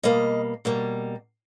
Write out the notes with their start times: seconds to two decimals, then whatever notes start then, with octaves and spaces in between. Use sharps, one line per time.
0.03 B2 G3 A#3 D#5
0.65 B2 G3 A#3